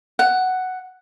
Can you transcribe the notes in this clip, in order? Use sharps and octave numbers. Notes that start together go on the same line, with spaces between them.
F#5